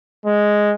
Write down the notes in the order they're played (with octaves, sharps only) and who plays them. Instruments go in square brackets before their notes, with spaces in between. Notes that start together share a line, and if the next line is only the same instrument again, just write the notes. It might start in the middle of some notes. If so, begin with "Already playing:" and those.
[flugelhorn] G#3